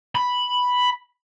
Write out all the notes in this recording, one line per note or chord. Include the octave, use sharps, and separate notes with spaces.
B5